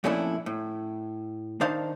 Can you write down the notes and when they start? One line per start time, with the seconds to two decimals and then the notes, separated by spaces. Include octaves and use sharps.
0.04 F2 A#2 A3 C#4 D4 E4
0.46 A2
1.61 D#3 D4 D#4 C5 F5 A5